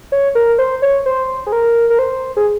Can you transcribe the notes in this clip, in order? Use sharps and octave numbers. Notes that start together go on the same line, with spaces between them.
C#5
A#4
C5
C#5
C5
G#4
A#4
A#4
C5
G#4